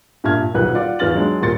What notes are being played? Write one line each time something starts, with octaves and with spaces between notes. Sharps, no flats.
G2 A#2 E5 A5 F6 G#6
D#1 B1 A#2 B4 F#5 F#6
F4 D5 F#5
E2 B3 F4 F6 A6 F#7
F#3 G#3 D4
D#1 A#2 A#3 C6 A6 C#7